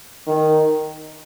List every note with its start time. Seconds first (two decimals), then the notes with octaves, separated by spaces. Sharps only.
0.27 D#3